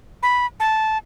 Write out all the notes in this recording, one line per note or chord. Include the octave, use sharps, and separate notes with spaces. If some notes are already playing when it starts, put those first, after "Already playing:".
B5
A5